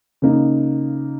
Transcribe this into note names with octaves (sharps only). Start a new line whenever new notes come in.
C#3 A#3 D#4